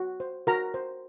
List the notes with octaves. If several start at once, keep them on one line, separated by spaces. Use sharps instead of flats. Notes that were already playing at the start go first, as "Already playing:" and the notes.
Already playing: F#4
C5
F#4 A#4 A#5
C5